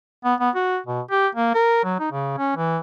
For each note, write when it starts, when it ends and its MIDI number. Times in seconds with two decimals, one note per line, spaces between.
0.24 0.34 59
0.40 0.50 59
0.55 0.78 66
0.86 1.01 47
1.11 1.27 67
1.35 1.54 58
1.55 1.83 70
1.84 1.95 54
2.00 2.09 63
2.12 2.34 49
2.38 2.55 61
2.56 2.79 52